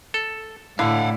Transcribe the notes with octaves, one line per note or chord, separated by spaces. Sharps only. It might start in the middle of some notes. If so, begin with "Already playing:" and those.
A4
A2 D3 E4 D5 F5 F#5